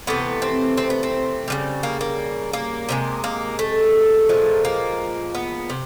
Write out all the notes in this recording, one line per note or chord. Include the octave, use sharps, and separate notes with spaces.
C3 E3 A3 B3
C4
C4
B3
C4
C#3 E3 G3
A#3
A#3
A#3
C3 F3 G#3
A#3
A3
A#2 F3 G#3
A#3
B3
C3